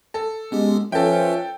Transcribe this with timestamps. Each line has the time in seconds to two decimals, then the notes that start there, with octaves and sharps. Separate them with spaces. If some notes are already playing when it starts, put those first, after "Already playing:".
0.14 A4
0.52 G#3 B3 C#4 G4
0.92 F3 C#4 A4 B4 C#5 E5 G5